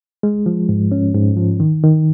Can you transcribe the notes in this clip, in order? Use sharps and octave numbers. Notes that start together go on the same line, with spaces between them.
G#3
F3
G#2
C#4
G#2
F3
D#3
D#3